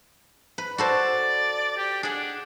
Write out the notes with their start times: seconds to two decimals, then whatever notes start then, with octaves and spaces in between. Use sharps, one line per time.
0.58 B4
0.78 F#4 A4 C5 D5
1.78 G4
2.03 D4 G#4 F#5